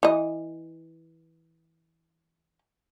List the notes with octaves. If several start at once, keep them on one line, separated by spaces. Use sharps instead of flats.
E3 D#5